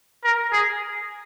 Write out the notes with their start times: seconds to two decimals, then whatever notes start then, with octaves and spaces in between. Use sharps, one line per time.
0.24 A#4
0.52 G#4